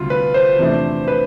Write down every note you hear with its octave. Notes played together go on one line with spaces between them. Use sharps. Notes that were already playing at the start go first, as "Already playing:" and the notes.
Already playing: D2 C3 G3 F4
B4
C5
E2 C3 F3 A3 D4
B4